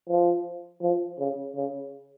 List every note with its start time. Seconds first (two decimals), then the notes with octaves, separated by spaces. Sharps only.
0.09 F3
0.82 F3
1.19 C#3
1.56 C#3